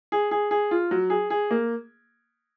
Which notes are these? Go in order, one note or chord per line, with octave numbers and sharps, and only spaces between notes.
G#4
G#4
G#4
F4
F#3
G#4
G#4
A#3